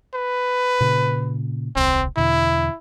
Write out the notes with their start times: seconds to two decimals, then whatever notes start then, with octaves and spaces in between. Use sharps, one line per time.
0.14 B4
0.81 A#2 C#3
1.76 D#1 C2 C4
2.17 E2 B2 D3 E4